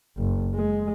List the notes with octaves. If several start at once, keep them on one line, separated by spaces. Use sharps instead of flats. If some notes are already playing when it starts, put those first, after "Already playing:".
F#1
G#3